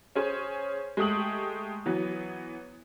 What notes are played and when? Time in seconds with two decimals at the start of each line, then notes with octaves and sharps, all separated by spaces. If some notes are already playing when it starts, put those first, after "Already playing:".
0.15 C#4 G#4 C5
0.97 G#3 A3 G4 D#6 F#7
1.86 E3 F#3 B3